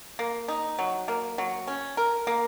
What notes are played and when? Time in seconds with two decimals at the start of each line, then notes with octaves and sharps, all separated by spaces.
0.19 A#3
0.48 D#4
0.79 F#3
1.08 A#3
1.38 F#3
1.68 C#4
1.97 A#4
2.27 A#3